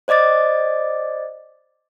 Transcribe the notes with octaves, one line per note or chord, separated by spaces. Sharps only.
C5 D5 D#5 D6 A6